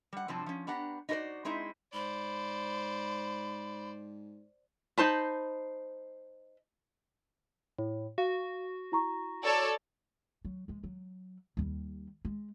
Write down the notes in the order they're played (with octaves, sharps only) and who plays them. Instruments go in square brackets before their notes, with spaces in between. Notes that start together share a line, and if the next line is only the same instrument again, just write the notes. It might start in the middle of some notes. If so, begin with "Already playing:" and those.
[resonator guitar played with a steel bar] G3 F#5
G2 C3 F3 F#3 C4 A5
F3 C#4
B3 D4 G4 F#5 A#5
D#4 E4 F#4 A#4 C5 D5
G#3 C4 D#4 E4 C5
[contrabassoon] G#2 [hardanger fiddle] C5 D5 [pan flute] B5
[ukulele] D#4 C5 A5 B5
[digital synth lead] A2
[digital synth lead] F#4 [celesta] F5
[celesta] E4 A#5 C#6
[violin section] A4 C#5 D5
[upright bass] F#3
E3 G#3
F#3
D#2 G3
G#3